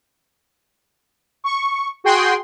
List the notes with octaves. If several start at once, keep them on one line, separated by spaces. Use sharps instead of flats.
C#6
F#4 G#4 G5 C6